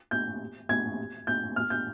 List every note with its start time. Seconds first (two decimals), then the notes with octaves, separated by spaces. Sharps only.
0.11 G6
0.69 G#6
1.27 G6
1.56 F6
1.70 G6